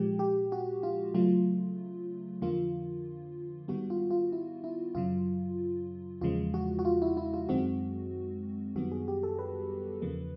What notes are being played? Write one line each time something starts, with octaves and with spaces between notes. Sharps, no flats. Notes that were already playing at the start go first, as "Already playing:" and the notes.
Already playing: A#2 F3 G#3 G4
G4
F#4
F4
C#3 F#3 A3 F4
F2 D3 F3 A#3 F4
G#2 D#3 G3 B3 F#4
F4
F4
E4
E4
F#2 C#3 F#3 F4
E2 C#3 F3 G#3 F4
F#4
F#4
F4
E4
E4
F4
F#2 D#3 G#3 C4 F#4
F#2 D#3 G3 B3 F#4
G#4
G4
A4
B4
E2 C#3 F3 A#3